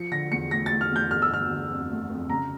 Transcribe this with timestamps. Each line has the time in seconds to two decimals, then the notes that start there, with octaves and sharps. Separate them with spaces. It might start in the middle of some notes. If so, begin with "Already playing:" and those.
Already playing: F3 C#7
0.11 D3 A#6
0.31 E2 C#7
0.51 A3 A#6
0.66 A3 A6
0.81 F6
0.91 E2
0.96 G6
1.11 G1 F6
1.22 E6
1.31 G1 F6
1.50 D3
1.70 F2
1.90 A3
2.10 F2
2.29 C#3 A#5